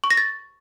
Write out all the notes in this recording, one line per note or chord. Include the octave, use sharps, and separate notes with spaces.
C#6
A#6
A6